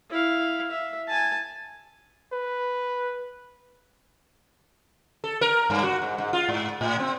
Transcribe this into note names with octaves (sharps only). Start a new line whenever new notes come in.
E4 F5
E5
G#5 A5
B4
A4
A#4
G2
F#4
G#2
G#2
F4
G#2
A2
C4